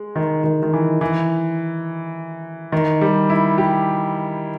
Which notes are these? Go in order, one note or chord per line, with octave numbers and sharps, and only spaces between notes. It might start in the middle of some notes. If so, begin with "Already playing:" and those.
Already playing: G#3
D#3
D#3
D#3
E3
E3
D#3
G3
E4
G4